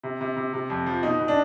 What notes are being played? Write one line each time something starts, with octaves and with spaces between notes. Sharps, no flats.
C3
C3
C3
C3
F2
F3
B2 D#4
B2
D4